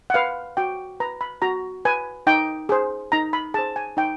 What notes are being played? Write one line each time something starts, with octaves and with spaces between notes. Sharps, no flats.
F#5
B4 F5
F#4 G5
B4 A#5
B5
F#4 A#5
B4 G#5
D#4 G5
G#4 C5
D#4 A#5
B5
G#4 C5 A5
G#5
D#4 G5